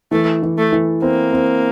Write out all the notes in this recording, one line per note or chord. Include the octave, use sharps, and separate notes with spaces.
E3 A3
E3
A3
E3
A#3 C4
C4